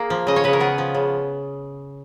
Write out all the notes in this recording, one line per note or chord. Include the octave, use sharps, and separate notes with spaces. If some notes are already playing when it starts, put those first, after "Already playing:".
Already playing: A#3 G#4
F3
C#3 D#5
C#5
C#3 B4
A#4
B3 G#4
F3
C#3